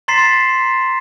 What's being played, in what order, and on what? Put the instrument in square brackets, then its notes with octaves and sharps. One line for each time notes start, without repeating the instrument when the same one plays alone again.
[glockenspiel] A#5 C6 A6 B6 C7 E7